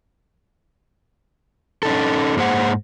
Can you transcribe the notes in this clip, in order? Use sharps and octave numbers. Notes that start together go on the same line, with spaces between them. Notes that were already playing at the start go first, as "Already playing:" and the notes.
C#4 D#4 A4
G#2 A#3 G#4 C5 F#5